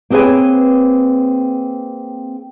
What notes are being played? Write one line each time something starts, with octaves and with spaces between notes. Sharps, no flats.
A#3 C4 G#4 B4 C#5 G#5